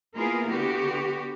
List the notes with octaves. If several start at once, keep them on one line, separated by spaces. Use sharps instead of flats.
A#3 B3 E4 F4 G#4 A#4
D3 B3 F#4 G4